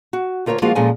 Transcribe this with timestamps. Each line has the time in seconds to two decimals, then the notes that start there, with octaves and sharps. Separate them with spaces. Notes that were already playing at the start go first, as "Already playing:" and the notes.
0.13 F#4
0.46 D2 F4 A#4 C5 C#5
0.62 F3 G3 G#3 A#3 F4 F#4
0.75 A#2 F3 G#3 C#4 A4 G#5